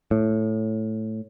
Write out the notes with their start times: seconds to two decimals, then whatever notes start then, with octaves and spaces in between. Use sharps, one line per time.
0.11 A2